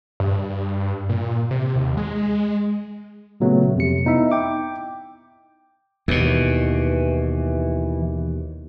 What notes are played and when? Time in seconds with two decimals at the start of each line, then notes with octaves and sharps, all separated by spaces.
0.20 G2
1.09 A#2
1.51 C3
1.76 D#2
1.97 G#3
3.40 A#2 C#3 F#3 A3 B3
3.76 F2 C3 C#7
4.05 B3 D#4 E4 E5
4.32 G5 D6
6.08 D#2 B2 E3